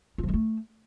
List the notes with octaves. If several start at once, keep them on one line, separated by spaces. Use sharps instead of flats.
F4
F3
G#3
A3